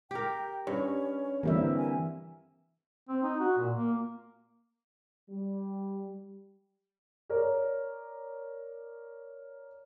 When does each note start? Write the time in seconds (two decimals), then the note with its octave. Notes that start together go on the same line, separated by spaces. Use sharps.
0.11 G4 A#4 G5
0.67 G2 C#4 C#5
1.43 D3 E3 G3 A#3 C4 E5
1.77 G#5
3.09 C4
3.23 D#4
3.40 F#4
3.57 A#2
3.75 A#3
5.28 G3
7.30 A#4 C#5 D5